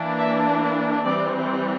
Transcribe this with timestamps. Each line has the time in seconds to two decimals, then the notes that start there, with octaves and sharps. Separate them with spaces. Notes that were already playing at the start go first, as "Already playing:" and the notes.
Already playing: E3 A#3 D4
0.18 E5
1.04 E3 G3 C4 D5